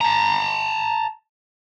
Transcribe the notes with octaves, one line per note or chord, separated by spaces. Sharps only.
A5 A#5